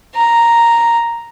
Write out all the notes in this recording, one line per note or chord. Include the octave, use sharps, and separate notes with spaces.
A#5